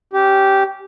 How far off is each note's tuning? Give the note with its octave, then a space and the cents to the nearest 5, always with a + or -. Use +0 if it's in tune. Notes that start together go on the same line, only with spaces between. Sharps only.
C#4 +0 G4 -10